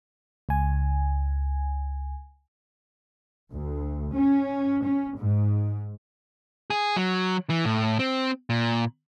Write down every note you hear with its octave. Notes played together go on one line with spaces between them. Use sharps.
C#2 G#5
D2
C#4
C#4
G#2
G#4
F#3
E3
A2
C4
A#2